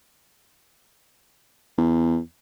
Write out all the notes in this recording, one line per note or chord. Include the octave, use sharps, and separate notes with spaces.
E2